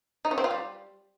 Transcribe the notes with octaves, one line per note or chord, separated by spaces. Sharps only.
D#4
C#4
C4
F4
G3